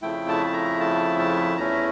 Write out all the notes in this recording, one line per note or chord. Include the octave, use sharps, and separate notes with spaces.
F2 C#3 F3 A3 E4 G5
A5
A5
A#5
A5
A5
E2 E3 A3 C#4 E4 A#5